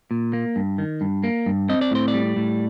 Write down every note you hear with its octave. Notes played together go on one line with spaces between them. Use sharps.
A#2
A#3
G2
D#3
G2
A#3
G2
C4 D#5
D5
A2 C5
D5
G3
A2